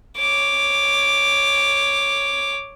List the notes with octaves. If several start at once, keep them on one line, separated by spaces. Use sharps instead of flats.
C#5 D6